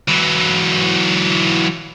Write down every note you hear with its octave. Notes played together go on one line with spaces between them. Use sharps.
E3 F#3